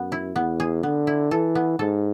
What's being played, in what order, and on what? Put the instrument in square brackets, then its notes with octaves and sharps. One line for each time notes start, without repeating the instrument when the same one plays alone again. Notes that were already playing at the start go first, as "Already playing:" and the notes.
Already playing: [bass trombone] F#2 [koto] B3
[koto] E4
[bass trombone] E2 [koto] B3
[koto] G#4
[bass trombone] D3 [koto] B3
[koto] E4
[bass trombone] E3 [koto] A4
[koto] B3
[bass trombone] G#2 [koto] A4